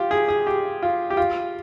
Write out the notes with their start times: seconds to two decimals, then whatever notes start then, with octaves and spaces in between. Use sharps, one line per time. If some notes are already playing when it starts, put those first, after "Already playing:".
Already playing: F4 G4
0.11 G#4
0.28 G#4
0.47 G4
0.82 F4
1.10 G4
1.17 F4